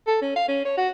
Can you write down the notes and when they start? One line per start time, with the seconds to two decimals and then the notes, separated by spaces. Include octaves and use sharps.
0.07 A4
0.22 C#4
0.36 F5
0.48 C#4
0.65 C#5
0.77 F#4